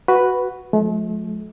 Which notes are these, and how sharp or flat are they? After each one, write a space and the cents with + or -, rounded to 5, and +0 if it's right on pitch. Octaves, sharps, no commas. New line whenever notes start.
F#4 +0 B4 +0
F3 +30 A3 -45